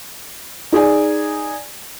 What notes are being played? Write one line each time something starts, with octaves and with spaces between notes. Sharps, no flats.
D#4 G#4 D5 G#5